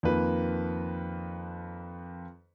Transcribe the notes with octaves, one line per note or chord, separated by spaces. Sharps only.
F2 D#3 F3 A#3 B4